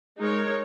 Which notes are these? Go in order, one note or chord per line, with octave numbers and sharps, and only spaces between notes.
G#3 D#4 A#4 C#5